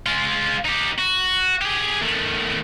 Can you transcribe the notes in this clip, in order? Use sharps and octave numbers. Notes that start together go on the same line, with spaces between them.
G#3 F4
D#4 G4
F#4
G4 G#4
D#3 A3